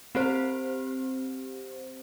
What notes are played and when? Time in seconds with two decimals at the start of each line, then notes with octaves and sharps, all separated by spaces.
0.15 C4 G4 C5